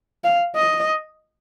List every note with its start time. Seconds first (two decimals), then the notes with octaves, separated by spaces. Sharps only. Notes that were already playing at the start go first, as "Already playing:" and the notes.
0.24 F5
0.56 D#5